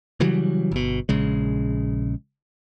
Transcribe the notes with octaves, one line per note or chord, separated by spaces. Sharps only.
C#3 E3 F#3 G3
G1 B2
A#1 C#3 G#3